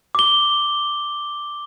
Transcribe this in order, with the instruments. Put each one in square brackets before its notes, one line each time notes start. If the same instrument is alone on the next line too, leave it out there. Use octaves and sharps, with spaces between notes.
[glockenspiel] D6 G7